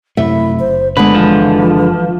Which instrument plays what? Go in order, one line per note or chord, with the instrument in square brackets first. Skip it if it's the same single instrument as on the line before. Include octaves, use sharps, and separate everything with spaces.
[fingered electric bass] F#2 C3 A3 [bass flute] E4 [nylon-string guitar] E5
[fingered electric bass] F#1 [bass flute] C5
[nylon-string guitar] D3 G#3 [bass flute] B3 [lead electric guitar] B4
[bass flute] E3 [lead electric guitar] F3